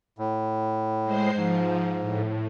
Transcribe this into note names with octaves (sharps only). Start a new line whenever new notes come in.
A2
G#3 C5 C7
G#2 F3
A2